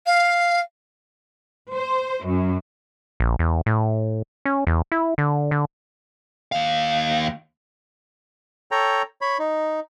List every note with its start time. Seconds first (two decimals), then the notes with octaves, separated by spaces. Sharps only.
0.06 F5
1.73 C5
2.26 F#2
3.20 A#1
3.39 E2
3.66 A2
4.45 C#4
4.67 E2
4.92 E4
5.18 D3
5.51 D3
6.52 D#2 F5
8.71 A4 C#5 G5 A#5
9.21 C#5 B5
9.39 D#4